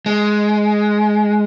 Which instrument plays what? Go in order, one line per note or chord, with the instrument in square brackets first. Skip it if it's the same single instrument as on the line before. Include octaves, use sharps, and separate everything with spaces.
[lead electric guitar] G#3